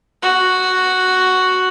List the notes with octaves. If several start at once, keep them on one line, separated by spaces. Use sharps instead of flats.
F#4